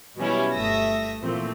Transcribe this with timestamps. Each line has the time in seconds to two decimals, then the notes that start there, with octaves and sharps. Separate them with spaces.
0.17 B2 F#3 G3 C#4 E4
0.54 G1 A3 E5 D#6 A#6
1.22 A#2 E3 F3 A3 C4